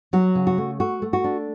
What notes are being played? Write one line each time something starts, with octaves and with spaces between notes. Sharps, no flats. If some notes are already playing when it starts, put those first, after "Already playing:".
F#3 F#4
C#3
F#4
A3
A3 F#4
A3
F#4
D4